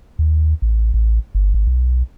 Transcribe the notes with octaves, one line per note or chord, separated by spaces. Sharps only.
D#2
A1
A1
G1
G#1
B1